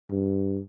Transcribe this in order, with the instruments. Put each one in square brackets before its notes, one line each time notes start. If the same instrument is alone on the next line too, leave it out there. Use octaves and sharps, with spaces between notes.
[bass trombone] G2